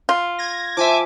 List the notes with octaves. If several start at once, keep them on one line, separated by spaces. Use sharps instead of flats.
F4
G#6 A#6
F3 E5 G#5 D6